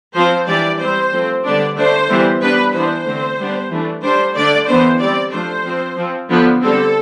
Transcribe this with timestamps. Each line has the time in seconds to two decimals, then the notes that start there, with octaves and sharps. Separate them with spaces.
0.15 F3 C4 C5
0.48 E3 G3 D4 D5
0.80 G3 C4 C5
1.12 F3 A3 C4
1.44 D3 G3 B3 D4 D5
1.76 D3 A3 D4 C5
2.09 E3 G3 B3
2.41 G3 B3 D4 B4
2.74 E3 B3 D4 C5
3.06 D3 A3 C4
3.39 G3 B3 D4
3.71 E3 A3 D4
4.03 G3 D4 C5
4.35 D3 A3 D4 D5
4.68 E3 B3 D4 C5
5.00 G3 C4 D5
5.32 F3 A3 D4 C5
5.64 F3 C4
5.97 F3 C4
6.29 D3 F3 B3 D4
6.62 D3 G3 C4 A4